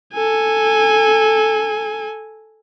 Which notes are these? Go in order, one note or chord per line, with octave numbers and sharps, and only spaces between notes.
A4 G#5